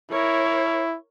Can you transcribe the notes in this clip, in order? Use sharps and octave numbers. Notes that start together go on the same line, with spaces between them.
E4 A#4 C#5